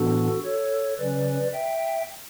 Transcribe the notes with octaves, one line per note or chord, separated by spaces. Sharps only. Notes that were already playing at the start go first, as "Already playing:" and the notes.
Already playing: A2 E3 B3 D4 F#4 A4
A4 C#5
C#3 F#3 C#4 B4 D5
E5 G5